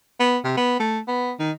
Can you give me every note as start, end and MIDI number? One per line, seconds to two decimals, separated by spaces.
0.20 0.38 59
0.44 0.55 48
0.57 0.76 59
0.79 0.99 57
1.08 1.34 59
1.39 1.51 51